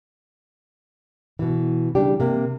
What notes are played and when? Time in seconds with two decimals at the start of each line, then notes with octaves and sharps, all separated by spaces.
1.39 B2 E3
1.95 C#3 G3 D4 G4
2.20 C3 A#3